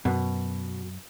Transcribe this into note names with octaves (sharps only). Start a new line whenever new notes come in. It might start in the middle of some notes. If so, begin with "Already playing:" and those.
F#2 B2